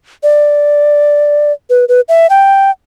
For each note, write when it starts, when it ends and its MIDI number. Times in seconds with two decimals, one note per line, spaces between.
0.23 1.52 74
1.70 1.85 71
1.89 2.01 71
2.08 2.27 76
2.30 2.71 79